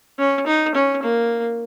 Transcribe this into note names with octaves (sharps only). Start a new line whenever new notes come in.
C#4
D#4
C#4
A#3